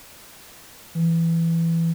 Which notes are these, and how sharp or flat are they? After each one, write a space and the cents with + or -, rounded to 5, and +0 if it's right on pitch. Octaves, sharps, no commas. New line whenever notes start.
E3 +10